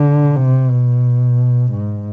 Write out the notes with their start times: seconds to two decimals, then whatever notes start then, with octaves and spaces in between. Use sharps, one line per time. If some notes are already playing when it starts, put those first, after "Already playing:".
Already playing: D3
0.36 C3
0.70 B2
1.72 G#2